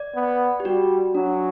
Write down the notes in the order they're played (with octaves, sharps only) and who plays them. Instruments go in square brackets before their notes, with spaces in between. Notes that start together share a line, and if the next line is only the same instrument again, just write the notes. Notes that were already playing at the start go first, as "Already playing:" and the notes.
Already playing: [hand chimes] D5
[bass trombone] B3
[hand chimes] G4
[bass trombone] G3 [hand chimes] F#4
[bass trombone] F#3 [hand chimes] D4